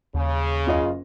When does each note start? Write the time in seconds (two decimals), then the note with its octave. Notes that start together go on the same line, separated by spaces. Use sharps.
0.14 D#2 C#3
0.66 F#1 F4 D#5